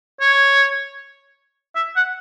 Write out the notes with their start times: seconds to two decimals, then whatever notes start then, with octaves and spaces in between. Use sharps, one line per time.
0.21 C#5
1.75 E5
1.96 F#5